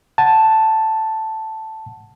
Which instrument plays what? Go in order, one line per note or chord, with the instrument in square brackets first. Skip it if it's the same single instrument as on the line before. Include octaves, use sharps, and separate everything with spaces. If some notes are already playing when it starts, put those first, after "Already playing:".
[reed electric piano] F#5 A5